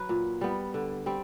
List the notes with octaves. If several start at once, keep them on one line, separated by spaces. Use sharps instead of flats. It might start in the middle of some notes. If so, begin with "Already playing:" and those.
Already playing: F#3 B4
A#2
G3 B3
D3
G3 C4